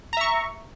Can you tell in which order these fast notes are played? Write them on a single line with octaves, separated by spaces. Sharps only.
A#5 E5 C#6